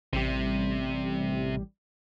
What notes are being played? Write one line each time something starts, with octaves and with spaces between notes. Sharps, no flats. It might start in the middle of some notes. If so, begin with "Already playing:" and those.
A1 C3 G3